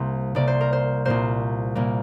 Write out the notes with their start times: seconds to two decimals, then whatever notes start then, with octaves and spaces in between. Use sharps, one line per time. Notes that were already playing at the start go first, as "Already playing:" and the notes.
Already playing: C2 C3 A#3 C5
0.35 C2 C3 A#3 D5
0.48 C5
0.61 A#4
0.73 C5
1.05 C2 A#2 A#3 C5
1.75 C2 A#2 A#3